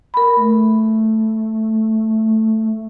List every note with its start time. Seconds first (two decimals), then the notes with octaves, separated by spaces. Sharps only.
0.14 A#4 B5
0.36 A3